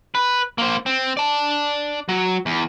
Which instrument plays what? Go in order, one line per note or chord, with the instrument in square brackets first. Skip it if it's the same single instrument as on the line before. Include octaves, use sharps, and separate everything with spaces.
[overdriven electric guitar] B4
A#3 C5
C4
D5 A5
F#3
E2